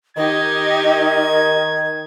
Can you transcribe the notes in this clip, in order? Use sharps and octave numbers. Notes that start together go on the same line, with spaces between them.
D#3 D#4 G4 D#5 G#6